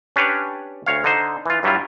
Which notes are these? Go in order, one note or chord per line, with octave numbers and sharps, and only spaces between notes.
C#4 D4 G4 B4 C#5 D5
D2 C#5 F5
D3 D#4 C5
E3 F4
G2 F#3 G3 E4 F4